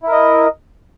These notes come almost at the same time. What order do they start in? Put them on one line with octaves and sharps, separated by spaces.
E4 A#4 D#5